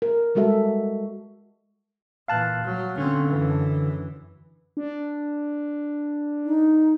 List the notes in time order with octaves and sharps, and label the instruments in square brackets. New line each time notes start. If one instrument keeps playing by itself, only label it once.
[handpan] A#4
G3 G#3 F#4 A4 E5
[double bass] A#2 E3 [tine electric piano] F5 A5 F#6
[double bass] F#3
[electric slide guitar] D3 [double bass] C4 C#4
[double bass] F#2 E3
[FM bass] D4
[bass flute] D#4